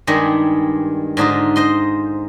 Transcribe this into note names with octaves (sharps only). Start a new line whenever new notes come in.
G2 D#3 G3 G#3
G#2 D3 D#4 F4
C5 D#5 C6